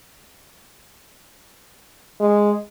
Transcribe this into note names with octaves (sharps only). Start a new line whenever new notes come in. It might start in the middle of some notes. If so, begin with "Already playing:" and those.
G#3